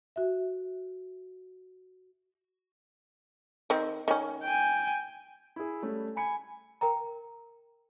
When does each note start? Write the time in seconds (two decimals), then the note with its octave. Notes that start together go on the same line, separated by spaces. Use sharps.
0.16 F#4 E5
3.70 D#3 C4
4.08 D#3 C#4
4.43 G5 G#5
5.56 E4 G#4
5.82 G3 A3 C#4
6.17 G#5 B5 C#7
6.81 A#4 G5 A#5